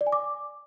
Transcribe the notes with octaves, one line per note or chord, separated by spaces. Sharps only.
D5
G#5
D6